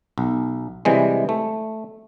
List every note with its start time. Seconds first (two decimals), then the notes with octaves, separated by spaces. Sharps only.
0.18 B1
0.85 C3 E3 G3 G#3
1.29 A3